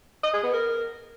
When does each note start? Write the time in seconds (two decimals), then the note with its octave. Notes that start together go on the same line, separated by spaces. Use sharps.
0.23 D#5
0.33 G#4
0.43 B3
0.53 A#4